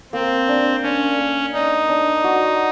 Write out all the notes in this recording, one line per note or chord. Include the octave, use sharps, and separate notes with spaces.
A#3 C4
D4
C#4 D4
A#3
D4 D#4
D4
F#4